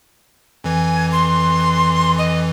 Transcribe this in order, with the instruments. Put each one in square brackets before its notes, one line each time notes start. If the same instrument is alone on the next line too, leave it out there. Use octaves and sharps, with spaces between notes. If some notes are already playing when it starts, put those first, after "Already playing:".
[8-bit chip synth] F2 E3 [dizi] G#5
[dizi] C6
D#5